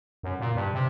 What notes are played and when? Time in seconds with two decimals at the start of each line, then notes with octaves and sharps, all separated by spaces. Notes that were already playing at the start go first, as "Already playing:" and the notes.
0.23 F#2
0.40 A#2
0.55 G2
0.74 C3